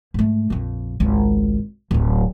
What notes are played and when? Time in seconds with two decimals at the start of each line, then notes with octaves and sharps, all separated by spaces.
0.14 G#2 A3
0.50 A#1 F2
1.00 G#1 C#2
1.91 D1 A1